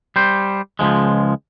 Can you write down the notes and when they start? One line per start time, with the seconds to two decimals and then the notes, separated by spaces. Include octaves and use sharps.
0.16 G3 C5
0.79 C#2 F#2 F3 G#3